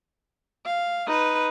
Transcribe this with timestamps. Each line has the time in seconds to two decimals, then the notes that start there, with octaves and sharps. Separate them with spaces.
0.65 F5
1.07 D#4 B4